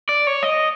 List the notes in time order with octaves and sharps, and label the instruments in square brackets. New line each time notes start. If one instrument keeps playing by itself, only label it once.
[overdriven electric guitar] D5
C#5
D#5